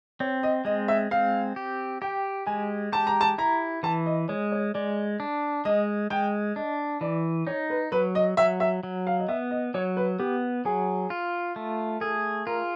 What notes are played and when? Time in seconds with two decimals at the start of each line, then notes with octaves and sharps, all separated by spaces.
0.20 C4 C#5
0.43 D#5
0.65 G#3 D#5
0.88 E5
1.11 C4 F5
1.56 G4
2.02 G4 G5
2.47 G#3 G#5
2.92 G4 A5
3.07 A#5
3.21 A5
3.38 E4 A#5
3.83 E3 A5
4.06 D#5
4.28 G#3 C#5
4.52 C#5
4.74 G#3 D5
5.20 D4
5.65 G#3 D#5
6.10 G#3 G5
6.56 D4 D#5
7.01 E3 D5
7.47 D#4 C#5
7.70 B4
7.92 F#3 B4
8.15 D#5
8.37 F#3 E5
8.60 E5
8.83 F#3
9.07 F5
9.19 D#5
9.28 B3 E5
9.51 D#5
9.74 F#3 C#5
9.97 B4
10.19 B3 G4
10.65 F#3 G#4
11.10 F4
11.56 A3
12.01 G#4 A4
12.46 F4 A#4